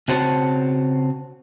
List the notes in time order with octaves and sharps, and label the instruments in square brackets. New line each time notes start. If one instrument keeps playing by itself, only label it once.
[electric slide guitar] C#3 C4 F#4 C5 C#5 A5